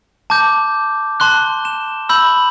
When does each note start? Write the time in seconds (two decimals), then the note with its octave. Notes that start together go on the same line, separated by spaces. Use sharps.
0.30 A5 D6 G6
1.20 A5 C6 F#6 G7
1.65 E7
2.09 B5 E6 G6 F#7